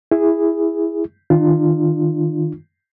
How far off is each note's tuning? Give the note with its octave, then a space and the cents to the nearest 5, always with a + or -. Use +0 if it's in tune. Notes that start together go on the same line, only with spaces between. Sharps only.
E4 +5 G#4 -10
D#3 +0 D4 +40 F4 -5